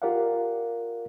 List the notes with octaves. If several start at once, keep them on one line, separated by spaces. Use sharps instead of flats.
F4 G4 A#4 D5 F5 F#5